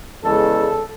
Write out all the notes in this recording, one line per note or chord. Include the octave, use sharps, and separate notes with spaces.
E2 C#3 G#3 A4